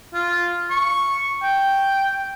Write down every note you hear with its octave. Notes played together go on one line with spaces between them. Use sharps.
F4
C#6
G5